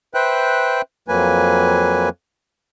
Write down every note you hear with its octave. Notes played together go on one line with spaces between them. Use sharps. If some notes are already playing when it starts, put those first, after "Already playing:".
B4 C5 E5 G5 F#6
F2 F#3 A#3 B4 G#5